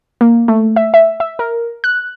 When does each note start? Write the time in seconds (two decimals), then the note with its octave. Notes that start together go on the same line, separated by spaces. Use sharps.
0.21 A#3
0.48 A3
0.76 E5
0.94 E5
1.20 E5
1.39 A#4
1.84 F#6